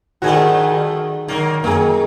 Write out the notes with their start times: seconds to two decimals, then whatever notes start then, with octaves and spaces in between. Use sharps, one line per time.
0.22 D#3 F3 G3 A3 F#4 G#4
1.28 D#3 F#3 A#3
1.64 F#2 D#3 A#3 G#4